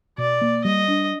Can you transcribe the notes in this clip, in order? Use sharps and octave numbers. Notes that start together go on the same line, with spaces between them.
B2 D5
A#3
G3 D#5
D4